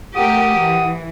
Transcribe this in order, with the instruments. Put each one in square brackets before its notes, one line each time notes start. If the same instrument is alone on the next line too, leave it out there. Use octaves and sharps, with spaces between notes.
[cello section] A3 G4 A#4 [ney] F#5 [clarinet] D#6
[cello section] E3